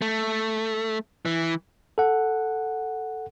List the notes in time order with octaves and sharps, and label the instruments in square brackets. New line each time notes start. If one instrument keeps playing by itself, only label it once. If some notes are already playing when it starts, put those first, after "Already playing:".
[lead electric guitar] A3
E3
[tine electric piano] A4 F#5